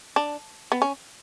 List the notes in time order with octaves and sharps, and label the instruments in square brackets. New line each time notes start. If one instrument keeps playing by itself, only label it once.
[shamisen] D4
B3
C#4